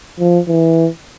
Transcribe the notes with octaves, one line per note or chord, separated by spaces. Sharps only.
F3
E3